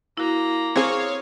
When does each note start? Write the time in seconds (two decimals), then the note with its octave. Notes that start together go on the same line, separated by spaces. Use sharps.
0.17 A#3 E4 F#4 A#5
0.76 C4 G#4 C#5 F5